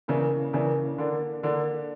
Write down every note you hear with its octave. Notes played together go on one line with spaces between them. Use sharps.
C#3 E3 A#3 D4
C#3 E3 A#3 D4
D3 A#3 D4
D3 A#3 D4